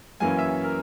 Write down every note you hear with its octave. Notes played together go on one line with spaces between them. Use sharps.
F#2 E3 A#3 C#4 G#5
E5
A#4